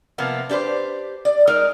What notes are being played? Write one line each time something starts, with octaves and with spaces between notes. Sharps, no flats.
C3 F3 A#3 B3
D4 G4 B4 C5
D5
G#3 D#4 A#4